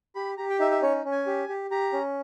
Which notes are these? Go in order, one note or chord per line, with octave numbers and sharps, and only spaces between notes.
G4 B5
G4 A#5
G5
D#4 E5
E5
C#4 C#5
C#4
G#5
G4
G4
G4 A#5
C#4